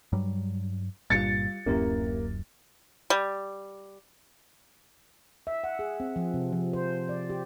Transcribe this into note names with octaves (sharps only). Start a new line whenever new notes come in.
G2 F#3 G3
G1 G2 A#2 G3 F4 A6 C#7
D1 F#2 A#3 C#4 E4 G4
G3
E5
F#5
G#4
C4
F3
C3
F3
C5
D5
G4